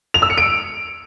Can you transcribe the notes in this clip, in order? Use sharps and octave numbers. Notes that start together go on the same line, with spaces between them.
F7
E6
C#7
D7